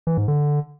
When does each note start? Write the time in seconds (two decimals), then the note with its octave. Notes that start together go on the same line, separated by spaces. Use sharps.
0.07 E3
0.17 G#2
0.28 D3